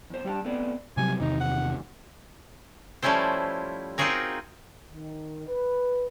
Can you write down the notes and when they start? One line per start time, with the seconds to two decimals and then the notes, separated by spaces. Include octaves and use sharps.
0.10 E2 C5
0.24 G3 G4 F#5 A5
0.45 A3 B3 C4 B4 D5
0.97 C3 F#3 G3 G#5
1.20 E2 C3 D#3 D#4
1.40 F#5
3.02 F3 G3 A3 C#4 E4 C5
3.98 C4 D#4 F4 F#4 G#4 A#4
4.92 D#3
5.48 B4